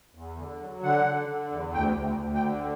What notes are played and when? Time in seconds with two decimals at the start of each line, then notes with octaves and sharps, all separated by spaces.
0.15 E2
0.37 D3
0.61 F#3
0.83 D3 F#5
1.06 D3
1.29 D3
1.51 E2
1.74 D2 G5
1.97 D2
2.19 D2
2.35 G5
2.42 D3